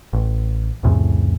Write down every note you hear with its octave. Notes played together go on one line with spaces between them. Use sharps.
A1
C2 F2 A2 C#3